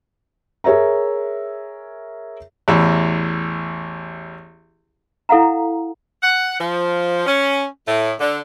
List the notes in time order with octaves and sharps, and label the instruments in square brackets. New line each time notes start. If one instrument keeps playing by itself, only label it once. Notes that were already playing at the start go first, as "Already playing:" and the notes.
[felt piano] G#4 A#4 C#5 E5 A#5
[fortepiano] A1 E2 E4
[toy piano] E4 A4 F5 F#5 A#5
[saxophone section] F#5
F3
C#4
A2
D3